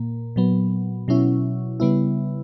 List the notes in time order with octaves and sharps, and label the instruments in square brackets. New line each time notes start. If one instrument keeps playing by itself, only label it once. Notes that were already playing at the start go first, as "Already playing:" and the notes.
Already playing: [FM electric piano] A#2 A#3
A#2 F#3 B3
B2 F#3 C#4 E4
C#3 G3 B3 E4